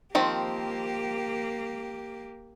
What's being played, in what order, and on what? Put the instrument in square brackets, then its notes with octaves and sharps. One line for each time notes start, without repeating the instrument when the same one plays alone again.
[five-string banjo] D#3 F3 C4 [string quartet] A#3 G4